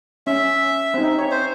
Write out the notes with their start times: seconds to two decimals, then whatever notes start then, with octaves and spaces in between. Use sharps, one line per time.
0.27 C#4 E5
0.94 C4 D#4
1.19 C#5
1.31 C5